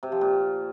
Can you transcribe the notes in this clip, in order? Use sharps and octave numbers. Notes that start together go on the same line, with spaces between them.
C3
F3
A#2